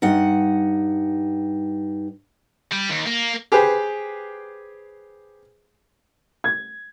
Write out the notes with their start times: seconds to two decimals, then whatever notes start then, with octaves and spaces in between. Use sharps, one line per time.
0.02 G2 D#4 F#5
2.72 G3
2.90 D#2
3.07 A#3
3.52 G4 G#4 B4 C5
6.44 G#6